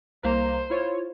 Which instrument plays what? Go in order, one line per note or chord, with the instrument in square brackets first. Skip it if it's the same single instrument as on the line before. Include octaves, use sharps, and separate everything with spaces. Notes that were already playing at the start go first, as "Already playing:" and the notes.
[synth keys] C2 A#3 A#5 [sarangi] C5
[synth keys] E4 F4 C#5